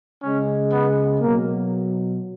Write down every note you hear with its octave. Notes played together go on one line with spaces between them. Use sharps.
C#3 G#3 C#4
B3
B2 F#3 A#3